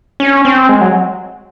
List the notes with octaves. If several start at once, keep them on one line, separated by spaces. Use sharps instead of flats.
C#4
C4
G#3
F#3